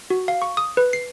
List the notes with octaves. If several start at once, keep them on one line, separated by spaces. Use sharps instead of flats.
F#4
F5
C#6
D#6
B4
C7